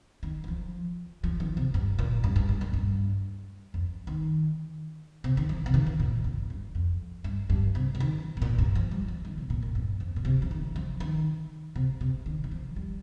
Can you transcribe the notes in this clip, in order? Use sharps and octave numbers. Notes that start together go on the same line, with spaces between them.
D#3
D#3
F3
F3
D#3
C3
G2
A#2
G2
G2
G2
A#2
G2
F2
D#3
C3
D#3
F3
C3
D#3
D#3
A#2
G2
G2
F2
G2
G2
C3
C3
D#3
C3
A#2
G2
F3
G3
F3
D#3
C3
A#2
A#2
G2
F2
A#2
C3
F3
D#3
F3
D#3
C3
C3
D#3
D#3
F3
G3